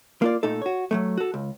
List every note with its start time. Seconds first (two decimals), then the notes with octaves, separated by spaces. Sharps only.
0.22 A#3 F4 D5
0.43 A#2 A3 D#4 A4
0.62 F#4 C#5
0.91 F#3 G#3 A3
1.18 F#4 A4
1.34 C#2